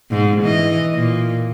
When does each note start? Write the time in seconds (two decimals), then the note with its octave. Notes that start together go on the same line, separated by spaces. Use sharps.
0.11 G#2
0.42 E3 D#5
0.95 A#2